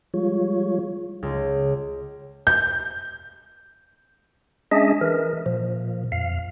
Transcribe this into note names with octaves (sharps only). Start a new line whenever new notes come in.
F3 G3 G#3 F4 C#5
C#2
G6
G#3 C#4 D4 G#4 D#5 E5
E3 A#4
A#2 F3
F2 F5